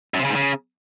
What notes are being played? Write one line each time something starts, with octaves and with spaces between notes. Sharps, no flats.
F#2
C3
C#3
G#2
C#3